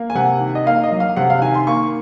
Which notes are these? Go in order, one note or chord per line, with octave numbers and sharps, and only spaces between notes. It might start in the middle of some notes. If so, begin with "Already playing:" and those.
Already playing: A#3
G#5
C3 F#5
D#3
D#5
A#3 F5
D#5
F#3
F5
C3 F#5
F5
D#3 G#5
C6
A#3 C#6